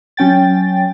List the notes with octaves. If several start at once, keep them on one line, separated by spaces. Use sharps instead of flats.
F#3 C#4 G5 A6